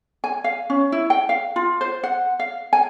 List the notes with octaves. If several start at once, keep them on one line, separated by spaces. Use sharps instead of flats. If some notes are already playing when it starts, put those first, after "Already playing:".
G#5
F5
C#4
E4
G5
F5
F4
C5
F#5
F5
G#5